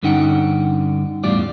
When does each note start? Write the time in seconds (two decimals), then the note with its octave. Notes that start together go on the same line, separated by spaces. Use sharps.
0.03 G2 D3 C#4 D#4 F#5 G5
1.24 E2 A2 G3 F4 D5